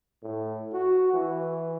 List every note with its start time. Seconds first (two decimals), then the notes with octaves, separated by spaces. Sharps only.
0.22 A2
0.73 F#4
1.13 E3